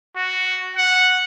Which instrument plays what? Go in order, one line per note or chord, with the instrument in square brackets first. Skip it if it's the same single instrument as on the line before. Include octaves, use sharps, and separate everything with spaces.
[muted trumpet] F#4
F#5